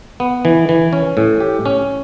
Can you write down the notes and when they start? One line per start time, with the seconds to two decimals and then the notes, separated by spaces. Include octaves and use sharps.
0.20 B3
0.45 E3
0.69 E3
0.93 C#4
1.17 A2
1.40 G4
1.65 C#4